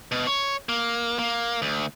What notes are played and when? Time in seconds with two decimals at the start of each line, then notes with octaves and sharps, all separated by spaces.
0.11 B2
0.27 C#5
0.69 A#3
1.19 A#3
1.62 D2